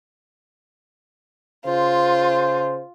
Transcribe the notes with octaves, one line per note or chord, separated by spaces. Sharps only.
C#3 F4 C5